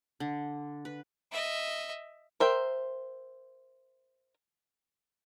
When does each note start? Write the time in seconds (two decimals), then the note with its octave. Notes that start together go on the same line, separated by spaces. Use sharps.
0.20 D3
0.85 B4
1.31 D#5 E5
2.40 A#4 C5 E5 G5